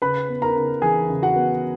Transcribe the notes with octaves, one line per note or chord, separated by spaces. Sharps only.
C#3 B4 B5
B3
A#4 A#5
C#3
E3 G#4 G#5
C#3
F#4 F#5
B3